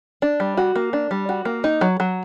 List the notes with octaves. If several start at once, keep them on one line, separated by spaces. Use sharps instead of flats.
D4
G3
F#4
A#3
D4
G3
F#4
A#3
D#4
F#3
F#3